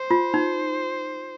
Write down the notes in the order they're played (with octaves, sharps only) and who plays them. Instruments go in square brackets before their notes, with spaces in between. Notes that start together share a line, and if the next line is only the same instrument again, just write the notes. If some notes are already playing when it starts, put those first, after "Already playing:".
Already playing: [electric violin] C5
[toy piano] F4
D#4